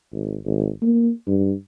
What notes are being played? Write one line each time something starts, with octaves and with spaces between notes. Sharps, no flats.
G#1
G#1
A#3
G2